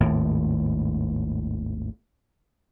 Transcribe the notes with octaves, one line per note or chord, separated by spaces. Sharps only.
G#1 D#2 A2